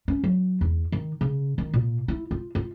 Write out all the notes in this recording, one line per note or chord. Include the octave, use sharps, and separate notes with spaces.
C#4
F#3
E2
D#3
C#3
D#3
A#2
E4
F4
F4